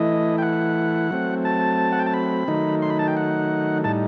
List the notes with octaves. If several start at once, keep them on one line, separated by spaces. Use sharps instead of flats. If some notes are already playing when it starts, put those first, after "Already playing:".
Already playing: E3 A3 E4 D#5
G5
F#5
F#3 A3 C4
A5
F#5
G5
A5
B5
D#3 F#3 A3 D#4
C6
B5
A5
G5
F#5
A2 G3 D#4 A5